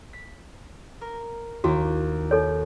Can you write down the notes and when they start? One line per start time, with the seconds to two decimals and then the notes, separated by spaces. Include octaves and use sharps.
0.13 B6
1.01 A#4
1.64 D#2 A#3 E4 F#4
2.31 D#4 A4 C#5